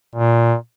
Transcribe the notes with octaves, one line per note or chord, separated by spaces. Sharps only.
A#2